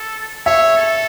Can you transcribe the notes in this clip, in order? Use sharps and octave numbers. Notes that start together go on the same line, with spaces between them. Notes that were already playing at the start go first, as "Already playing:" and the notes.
Already playing: A4
C#5 E5
A4